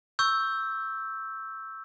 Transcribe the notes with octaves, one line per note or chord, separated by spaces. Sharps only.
C#6 E6 G6